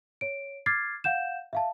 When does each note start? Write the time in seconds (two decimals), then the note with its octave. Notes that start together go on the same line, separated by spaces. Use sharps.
0.21 C#5 D7
0.66 D6 F6 G#6 A6 C7
1.04 F5 F#5 G6 E7
1.53 E5 F5 A5